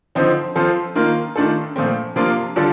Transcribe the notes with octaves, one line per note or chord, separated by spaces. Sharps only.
D3 F3 C4 D#4
F3 C4 F4 A4
D#3 A#3 F4
D#3 A3 D4 F4 A4
A#2 F3 A3 C4
C3 F3 A#3 D4 F4
D3 G3 D4 F4 A4